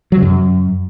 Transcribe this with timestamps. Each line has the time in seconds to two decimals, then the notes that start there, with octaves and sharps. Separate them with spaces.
0.12 F#3
0.17 C#3
0.22 F#2